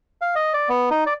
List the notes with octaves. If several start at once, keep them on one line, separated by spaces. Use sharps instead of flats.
F5
D#5
D5
B3
D#4
D5